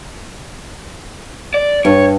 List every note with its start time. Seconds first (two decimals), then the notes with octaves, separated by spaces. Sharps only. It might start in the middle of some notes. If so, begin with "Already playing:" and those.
1.54 D5
1.85 G2 C#5